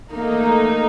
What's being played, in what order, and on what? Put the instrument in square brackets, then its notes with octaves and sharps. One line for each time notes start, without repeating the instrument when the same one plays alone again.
[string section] A3 D#4 [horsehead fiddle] A#3